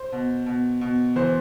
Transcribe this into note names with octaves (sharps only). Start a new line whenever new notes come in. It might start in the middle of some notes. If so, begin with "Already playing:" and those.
Already playing: C5
B2
B2
B2
E3 C5